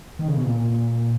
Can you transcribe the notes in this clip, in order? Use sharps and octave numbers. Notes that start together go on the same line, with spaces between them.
D#3
C#3
B2
A#2
A#2